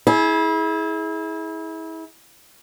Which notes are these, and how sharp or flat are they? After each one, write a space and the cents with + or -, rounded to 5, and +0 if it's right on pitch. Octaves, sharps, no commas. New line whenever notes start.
E4 -30 G#4 +20